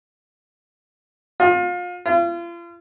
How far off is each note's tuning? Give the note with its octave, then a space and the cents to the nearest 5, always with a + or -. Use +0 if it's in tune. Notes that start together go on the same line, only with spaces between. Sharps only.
F4 +30
F4 -40